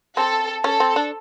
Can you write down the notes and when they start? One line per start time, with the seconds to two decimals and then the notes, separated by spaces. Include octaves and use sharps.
0.17 C4 A4
0.64 C#4 A4
0.80 C4
0.96 D4